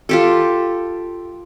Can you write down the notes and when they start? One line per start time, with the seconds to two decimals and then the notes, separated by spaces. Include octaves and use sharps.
0.09 F4 G4 A4